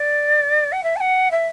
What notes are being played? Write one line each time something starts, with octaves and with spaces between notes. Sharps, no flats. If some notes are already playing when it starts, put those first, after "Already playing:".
Already playing: D5
F#5
E5
A5
F#5
E5